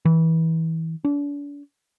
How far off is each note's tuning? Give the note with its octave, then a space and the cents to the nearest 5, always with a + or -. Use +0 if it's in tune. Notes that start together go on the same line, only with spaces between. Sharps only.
E3 -25
D4 -40